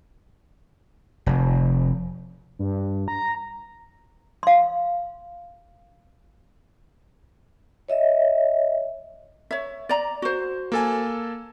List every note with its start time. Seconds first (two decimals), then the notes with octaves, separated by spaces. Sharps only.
1.26 F1
2.59 G2
3.08 A#5
4.43 F5 C6
7.88 C#5 D#5 E5
9.51 C#5 E5
9.89 D5 A#5
10.22 F#4 C5
10.72 A#3 A4 G#5